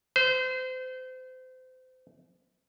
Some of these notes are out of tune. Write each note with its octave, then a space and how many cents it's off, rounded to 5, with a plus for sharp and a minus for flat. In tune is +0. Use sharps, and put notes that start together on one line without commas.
C5 -30